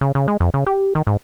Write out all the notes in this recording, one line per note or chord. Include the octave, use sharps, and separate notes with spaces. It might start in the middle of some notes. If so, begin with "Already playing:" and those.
C#3
C#3
G#3
F2
C#3
G4
D#3
G#2